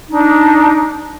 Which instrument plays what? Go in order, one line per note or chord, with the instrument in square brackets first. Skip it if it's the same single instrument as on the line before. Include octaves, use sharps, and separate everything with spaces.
[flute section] D4 D#4